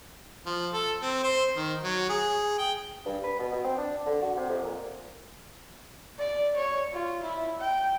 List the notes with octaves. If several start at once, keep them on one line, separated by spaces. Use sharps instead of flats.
F3
A4
C4
C5
D#3
F#3
G#4
G5
G2
B4
B2
B2
C4
D4
D3
F#4
C3
F2
A#2
D5
C#5
F4
E4
G5